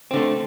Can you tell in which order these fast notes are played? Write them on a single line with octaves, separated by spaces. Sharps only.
C4 D3 A3